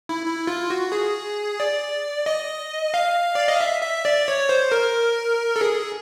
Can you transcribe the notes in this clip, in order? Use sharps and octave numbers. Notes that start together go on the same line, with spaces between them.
E4
E4
F4
F#4
G#4
D5
D#5
F5
D5
D#5
E5
E5
D5
C#5
C5
A#4
A4
G#4